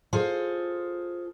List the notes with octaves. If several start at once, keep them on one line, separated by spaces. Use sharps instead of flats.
F4 G#4 A4 C5